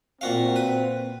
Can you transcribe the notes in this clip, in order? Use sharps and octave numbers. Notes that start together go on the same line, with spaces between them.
A#2 C4 F#4 F5
B4